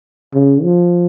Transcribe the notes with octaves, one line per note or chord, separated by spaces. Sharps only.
C#3
F3